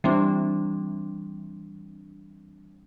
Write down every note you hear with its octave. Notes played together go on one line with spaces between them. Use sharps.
E3 G3 C4 D4